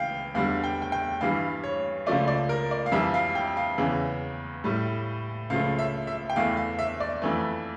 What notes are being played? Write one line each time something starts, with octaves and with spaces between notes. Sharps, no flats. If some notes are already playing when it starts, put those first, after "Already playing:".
Already playing: C#2 E3 F5 G5
E2 D3 G3 F5
G5
G5
G5
G2 E3 G3 F5
C#5
C#2 C#3 F3 A3 D5
D5
A#4
D5
F5
F2 E3 G3 E5
F5
G5
F5
E2 C#3 E3
A2 G3
C#2 C#3 F3 A3 F5
E5
E5
G5
E2 E3 A3 F5
F5
E5
D5
F2 E3 A3